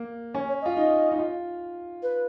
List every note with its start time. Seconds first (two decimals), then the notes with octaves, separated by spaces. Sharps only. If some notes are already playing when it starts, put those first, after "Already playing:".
Already playing: A#3
0.34 C#4 C#5
0.48 C#5
0.62 D#5
0.66 F4
0.76 D#4 D#5
1.12 D#4
1.19 F4
2.03 B4